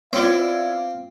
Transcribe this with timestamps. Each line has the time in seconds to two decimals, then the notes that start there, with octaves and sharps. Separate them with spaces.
0.13 B3 C4 E4 F4 C#5 D5 F5